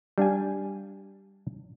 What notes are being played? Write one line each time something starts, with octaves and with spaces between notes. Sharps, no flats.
G3 D4 F5 G#5